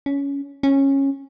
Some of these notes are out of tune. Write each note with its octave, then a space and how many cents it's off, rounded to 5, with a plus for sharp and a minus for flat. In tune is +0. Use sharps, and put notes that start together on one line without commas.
C#4 +15
C#4 -15